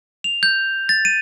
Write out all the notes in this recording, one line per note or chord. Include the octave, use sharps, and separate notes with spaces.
F7
G6
A6
D#7